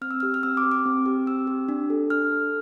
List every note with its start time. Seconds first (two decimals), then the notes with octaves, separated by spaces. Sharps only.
0.01 C4 F6
0.11 E6
0.20 G4 F6
0.34 F6
0.43 C4 E6
0.57 D6
0.64 G4
0.71 D6
0.86 C4
1.06 G4
1.26 C4 E6
1.47 G4
1.69 D4
1.90 A4
2.10 D4 F6
2.32 A4